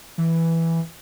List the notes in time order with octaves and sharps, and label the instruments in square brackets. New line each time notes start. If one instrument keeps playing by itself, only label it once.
[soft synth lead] E3